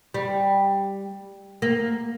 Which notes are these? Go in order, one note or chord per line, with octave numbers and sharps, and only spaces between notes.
G3
A#3